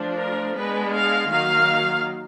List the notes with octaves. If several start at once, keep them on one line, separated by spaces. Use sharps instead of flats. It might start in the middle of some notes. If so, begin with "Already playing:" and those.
Already playing: F3 A3 D4
A#4
G#3 B3 D4 B4
F5
D#3 F#3 A#3 F5